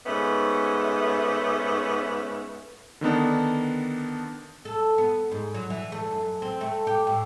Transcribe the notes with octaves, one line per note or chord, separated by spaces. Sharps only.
G#2 A3 B3 C#4
D3 D#3 B3 D4
A4
B3
G#2
F#3
E3
A3
F#2
C4
A3
G4
A2